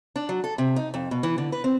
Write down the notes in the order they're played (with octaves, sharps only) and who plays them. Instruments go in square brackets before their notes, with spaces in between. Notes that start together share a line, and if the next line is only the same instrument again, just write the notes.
[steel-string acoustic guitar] D4
F#3
A4
C3
D#4
F2
B2
E3
D3
B4
C4